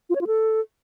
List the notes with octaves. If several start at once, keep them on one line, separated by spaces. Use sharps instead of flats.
F4
C#5
F4
A4